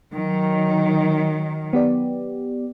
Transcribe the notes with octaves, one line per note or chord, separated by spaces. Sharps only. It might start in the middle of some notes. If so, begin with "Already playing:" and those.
D#3 F#3
B3 G4 D5